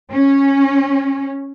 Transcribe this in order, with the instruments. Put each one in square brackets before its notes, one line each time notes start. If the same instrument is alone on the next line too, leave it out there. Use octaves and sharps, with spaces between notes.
[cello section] C#4